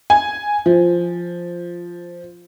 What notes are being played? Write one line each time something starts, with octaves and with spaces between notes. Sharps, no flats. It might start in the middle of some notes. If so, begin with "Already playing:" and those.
G#5
F3